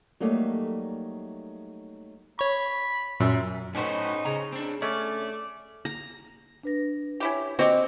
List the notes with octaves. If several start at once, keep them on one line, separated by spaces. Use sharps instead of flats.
F#3 G3 A3 A#3 D#4 A4
C#5 B5 C#6
F#2 A#2 E5
A2 C#4 D#4 F#4 B4 C5
C#3 A#5
C4 D4
A3 C#4 D5
A#5
D4 B4 A#6
C#4 E4 G4
C4 F#4 G4 D#5